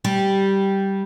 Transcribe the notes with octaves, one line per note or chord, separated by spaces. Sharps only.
G3